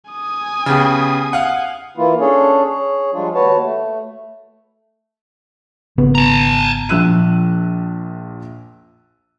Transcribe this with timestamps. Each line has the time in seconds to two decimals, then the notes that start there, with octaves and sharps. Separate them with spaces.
0.11 G#5 D#6
0.66 C#3 B3 G4
1.33 F5 F#5
1.97 E3 A#3 E4 F4
2.20 C#4 D4 G#4 A4 C#5
2.64 G#4 C#5
3.13 F3 G3 G#3 D4 F4
3.34 D#2 F#4 B4 C#5 A5
3.62 A3
5.98 G#1 C#3 B3
6.15 A5 A#5
6.89 A#1 F3 E6 F#6 D#7